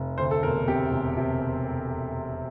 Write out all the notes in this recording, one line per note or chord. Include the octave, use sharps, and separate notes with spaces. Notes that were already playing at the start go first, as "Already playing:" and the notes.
Already playing: F1
D2 C5
A4
E1 A#4
C3 G4
E1
C3